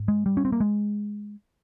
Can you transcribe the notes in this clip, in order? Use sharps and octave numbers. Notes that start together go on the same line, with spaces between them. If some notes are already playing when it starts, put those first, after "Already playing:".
Already playing: G#2
G#3
G3
C#4
C4
A#3
G#3